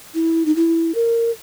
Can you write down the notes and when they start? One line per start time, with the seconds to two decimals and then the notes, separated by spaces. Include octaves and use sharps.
0.15 E4
0.46 D#4
0.56 E4
0.95 A#4